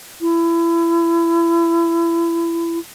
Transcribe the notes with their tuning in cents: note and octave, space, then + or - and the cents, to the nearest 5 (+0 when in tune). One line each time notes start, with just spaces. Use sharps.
E4 +30